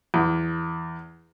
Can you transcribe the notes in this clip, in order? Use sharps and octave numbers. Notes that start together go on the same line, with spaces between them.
E2